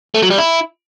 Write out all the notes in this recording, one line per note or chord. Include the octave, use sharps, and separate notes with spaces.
A3
F#3
G3
E4